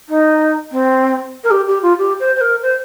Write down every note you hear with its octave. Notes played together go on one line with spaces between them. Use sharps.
D#4
C4
A#4
G4
G4
F4
G4
C5
C5
A#4
C5